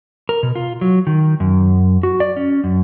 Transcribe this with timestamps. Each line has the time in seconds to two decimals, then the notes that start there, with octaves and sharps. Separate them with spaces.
0.29 A#4
0.43 B2
0.55 F4
0.81 F#3
1.07 D#3
1.40 F#2
2.03 F#4
2.20 D5
2.36 C#4
2.64 F#2